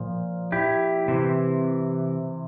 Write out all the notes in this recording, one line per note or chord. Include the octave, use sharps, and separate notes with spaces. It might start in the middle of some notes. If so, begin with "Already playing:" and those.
Already playing: A#2 F3
E4 G4
C3 E3